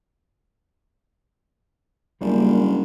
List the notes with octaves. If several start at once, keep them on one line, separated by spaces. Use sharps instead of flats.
F#1 G3 A#3 D4